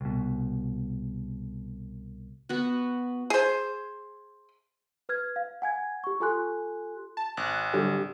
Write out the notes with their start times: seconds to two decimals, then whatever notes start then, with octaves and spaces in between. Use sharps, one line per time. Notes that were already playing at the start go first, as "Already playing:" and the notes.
0.01 C2 B2
2.49 B3 F#4
3.30 G#4 C5
5.09 B4 F6 G#6
5.36 F5
5.62 F#5 G#5 G#6
6.04 G4 C#6
6.20 F4 G4 A4 G#5 C6 F#6
7.17 A5
7.37 G#1 F#6
7.74 D3 F#3 G3 G4